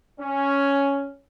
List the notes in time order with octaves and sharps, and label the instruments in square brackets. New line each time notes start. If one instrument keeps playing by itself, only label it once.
[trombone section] C#4